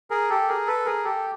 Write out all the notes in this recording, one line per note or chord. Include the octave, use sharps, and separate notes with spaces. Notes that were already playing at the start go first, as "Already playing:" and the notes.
G#4 A#4
G4 A4
G#4 A#4
A4 B4
G#4 A#4
G4 A4